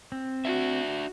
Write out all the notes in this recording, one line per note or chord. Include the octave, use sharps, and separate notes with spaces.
C4
D4 F#4 E5